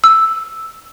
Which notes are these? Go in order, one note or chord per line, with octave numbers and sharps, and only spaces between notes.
E6